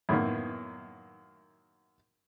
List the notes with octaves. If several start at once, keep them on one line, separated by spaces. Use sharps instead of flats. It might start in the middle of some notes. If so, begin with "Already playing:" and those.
F#2 A2 D#3 A#3 B3 E4